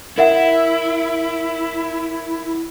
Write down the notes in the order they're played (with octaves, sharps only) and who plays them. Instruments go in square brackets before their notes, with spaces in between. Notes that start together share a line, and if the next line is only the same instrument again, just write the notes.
[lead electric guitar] E4 [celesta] A#4 E5 F#5